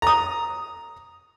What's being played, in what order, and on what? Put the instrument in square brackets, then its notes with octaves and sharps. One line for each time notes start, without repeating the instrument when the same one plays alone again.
[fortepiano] A#5 D#6